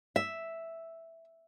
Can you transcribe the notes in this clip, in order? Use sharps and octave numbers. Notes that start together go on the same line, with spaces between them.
E5